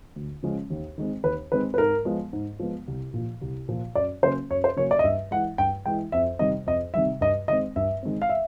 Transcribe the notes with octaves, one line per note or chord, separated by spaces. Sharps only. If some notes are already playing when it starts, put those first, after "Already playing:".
D2
C#3 F3 G#3 C#4
D#2
D#3 G#3 C4
D#2 B4
D#3 G#3 C4 B4
B4
G#2 A#4
F3 G#3 B3
G#2
F3 G#3 B3
C2
A#2 F3
C2
A#2 F3
F#2 D5
C#3 F#3 A#3 C#4 C5
F#2 C#5
C5
C#3 F#3 A#3 C#4 C#5
D5
D#5
G2 E5
E3 G#3 F#5
G2 G5
E3 G#3 G5
F2 E5
C3 D#3 G3 D#5
F2 D#5
C3 D#3 G3 E5
G2 D#5
D#3 G#3 C4 D#5
G2 E5
D#3 G#3 C4
F5
E5